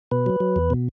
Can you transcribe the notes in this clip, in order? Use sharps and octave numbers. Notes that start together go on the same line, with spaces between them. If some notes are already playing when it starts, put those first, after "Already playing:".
B2 B4
F#3
F#3
E2
B2